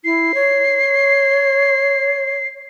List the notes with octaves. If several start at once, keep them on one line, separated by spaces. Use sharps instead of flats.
E4 C7
C#5